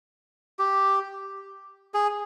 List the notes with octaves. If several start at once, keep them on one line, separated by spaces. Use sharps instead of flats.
G4
G#4